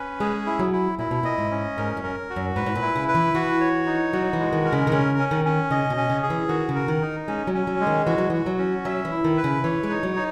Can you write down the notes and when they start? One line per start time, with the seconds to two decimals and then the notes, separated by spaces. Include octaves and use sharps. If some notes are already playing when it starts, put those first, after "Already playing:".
Already playing: C#4 B4
0.20 G#3 G#4
0.46 E4
0.59 F#3
0.73 E4
0.99 A#2 E4
1.11 B2
1.23 A#2 D#5
1.38 G#2
1.51 C#4
1.77 G#2 A#4
1.97 F#2
2.04 A#4
2.30 F#4
2.36 F#2
2.56 G#2 B4
2.66 G#2
2.75 A#2
2.82 E4
2.96 C#3
3.08 B4
3.15 E3
3.35 E3 F#4
3.61 C#5
3.86 D#4
4.13 F#3 F#4
4.33 E3
4.40 G#3
4.53 D#3
4.65 A#4
4.72 C#3
4.87 D#3
4.92 C#3 C#4
5.18 C#4
5.31 D#3
5.45 C#4
5.71 C#3 D#5
5.90 B2
5.97 C#4
6.10 C#3
6.23 G#4
6.30 E3
6.49 D#3 F#4
6.69 C#3
6.75 A#4
6.88 D#3
7.02 D#4
7.28 G#3 C#4
7.47 F#3
7.54 C#4
7.67 F#3
7.80 G#3
7.87 D#3
8.06 E3 F#4
8.18 F#3
8.30 E3 F#4
8.46 F#3
8.58 C#4
8.85 F#3 E5
9.05 E3
9.11 E4
9.24 D#3
9.37 B4
9.44 C#3
9.64 E3 C#5
9.83 G#3
9.90 D#4
10.03 F#3
10.16 D#4